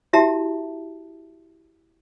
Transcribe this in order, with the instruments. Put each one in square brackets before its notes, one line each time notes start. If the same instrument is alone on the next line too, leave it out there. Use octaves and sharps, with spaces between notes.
[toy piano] E4 F#4 G4 E5 A5 A#5